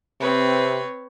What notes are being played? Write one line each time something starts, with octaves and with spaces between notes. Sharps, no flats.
C3 C4 B4 C#5